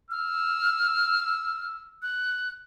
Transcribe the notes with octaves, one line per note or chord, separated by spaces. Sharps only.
E6 F6
F#6